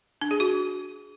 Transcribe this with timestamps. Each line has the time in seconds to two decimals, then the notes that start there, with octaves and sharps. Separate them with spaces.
0.21 D4
0.31 G#4
0.40 F#4